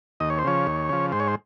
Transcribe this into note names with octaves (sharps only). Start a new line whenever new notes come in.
D#2 D#5
C#5
C5
C#3 F3 C#5
D#2
C#3 F3
G#2 C5
C#5
C5